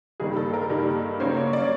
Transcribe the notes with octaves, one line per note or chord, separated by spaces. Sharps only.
G2 D#3 G3 A#3 G#4
A4
A#4
G2 D#3 G3 A#3
C#3 F#3 A#3 C#4 C5
C#5
D5